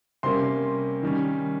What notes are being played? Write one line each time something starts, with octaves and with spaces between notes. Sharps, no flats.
C3 G3 A#3 C#4 C6
D#3 G3 C#4